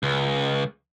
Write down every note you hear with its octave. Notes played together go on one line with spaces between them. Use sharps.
C#2